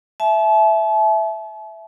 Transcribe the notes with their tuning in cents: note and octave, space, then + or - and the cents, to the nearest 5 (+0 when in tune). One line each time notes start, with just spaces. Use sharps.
E5 +0 A5 -40